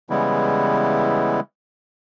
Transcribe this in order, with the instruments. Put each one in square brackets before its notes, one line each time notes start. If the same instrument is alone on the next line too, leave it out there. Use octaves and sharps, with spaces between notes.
[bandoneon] C#3 E3 G3 G#3 B3 E4